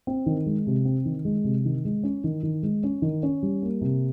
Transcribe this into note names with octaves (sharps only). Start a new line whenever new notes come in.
C4
D#3
G#3
C3
C4
D#3
G#3
C3
D#3
G#3
C#4
D#3
D#3
G#3
C#4
D#3
C#4
G3
A#3
C3